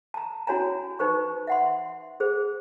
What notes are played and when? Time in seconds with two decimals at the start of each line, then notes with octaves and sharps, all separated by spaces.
0.14 A5 A#5
0.47 C#4 E4 F#4 C#5 G#5 A#5
0.99 D#4 B4 C5 C#6
1.47 E5 F#5 C6
2.20 G#4 C5